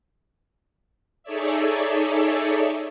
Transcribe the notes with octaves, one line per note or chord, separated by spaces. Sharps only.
D#4 G#4 A4 C#5 D5 E5